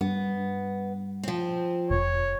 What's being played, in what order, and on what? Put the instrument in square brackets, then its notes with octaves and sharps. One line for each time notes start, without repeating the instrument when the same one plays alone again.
[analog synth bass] G2 [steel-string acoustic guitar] B3
[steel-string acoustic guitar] F3 C4
[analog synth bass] F1 [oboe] C#5